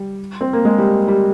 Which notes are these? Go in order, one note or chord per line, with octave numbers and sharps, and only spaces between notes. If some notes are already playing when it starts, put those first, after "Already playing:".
Already playing: G3
C4
A#3
G#3
G3
G3